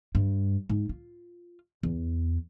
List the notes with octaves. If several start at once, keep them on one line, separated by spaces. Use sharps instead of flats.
G2
G#2
F4
E2